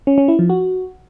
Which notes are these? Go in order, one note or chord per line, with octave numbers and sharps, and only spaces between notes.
C#4
C#4
E4
F3
F#4